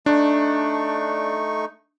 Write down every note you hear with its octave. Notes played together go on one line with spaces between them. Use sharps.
A3 D4 D#4 C#6